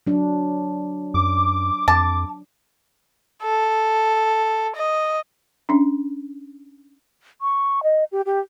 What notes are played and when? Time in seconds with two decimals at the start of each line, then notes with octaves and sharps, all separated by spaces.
0.07 F#3 D4
1.14 F#2 D6
1.88 F2 A5
3.42 A4
4.76 D#5
5.69 C#4 D4
7.41 C#6
7.83 D#5
8.12 G4
8.26 G4